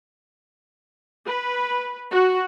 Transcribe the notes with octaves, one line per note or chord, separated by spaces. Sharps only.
B4
F#4